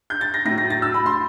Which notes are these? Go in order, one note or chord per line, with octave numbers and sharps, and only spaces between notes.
G6
A6
A#6
A2 A#6
F#3
A#6
A6
E6
B5
C6